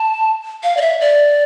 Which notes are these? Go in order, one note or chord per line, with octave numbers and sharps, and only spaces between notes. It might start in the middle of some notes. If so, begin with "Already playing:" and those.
Already playing: A5
F5
D5
E5
D5